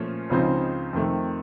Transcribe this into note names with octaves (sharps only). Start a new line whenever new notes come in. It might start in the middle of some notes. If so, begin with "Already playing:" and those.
Already playing: A#2 F3 A3 C#4
C#2 C#3 F3 C4 D#4
F2 C3 D#3 A3